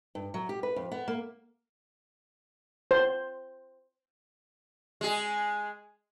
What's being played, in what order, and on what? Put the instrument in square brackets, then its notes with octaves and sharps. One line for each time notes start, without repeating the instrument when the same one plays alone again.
[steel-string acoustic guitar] G2
F#3
G4
B4
F2
B3
A#3
[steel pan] C5
[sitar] G#3 G#4